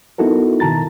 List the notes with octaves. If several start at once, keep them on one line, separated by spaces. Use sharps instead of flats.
B3 D#4 E4 F#4 A4 A#4
B2 D#3 A5 A#5 A6